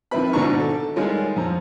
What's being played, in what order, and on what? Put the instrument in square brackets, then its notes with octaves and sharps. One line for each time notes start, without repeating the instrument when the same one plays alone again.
[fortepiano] D#3 F3 C4 E4 B4 B5
G#1 G#2 B2 D4 A#5 C#6
A4
D#3 G3 G#3 F4 C#5
F2 F3 A#5